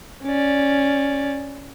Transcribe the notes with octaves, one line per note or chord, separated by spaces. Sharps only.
C#4 D5